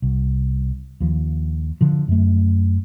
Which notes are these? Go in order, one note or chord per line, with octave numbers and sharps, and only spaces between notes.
C2
D#2 F3
D3 F3
F#2 A3